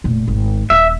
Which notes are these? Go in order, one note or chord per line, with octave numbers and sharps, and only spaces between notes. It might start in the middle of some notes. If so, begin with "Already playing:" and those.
F1 A#2
G#1
D#1 E5